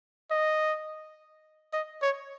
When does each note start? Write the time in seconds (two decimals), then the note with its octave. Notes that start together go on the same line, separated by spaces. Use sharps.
0.31 D#5
1.73 D#5
2.02 C#5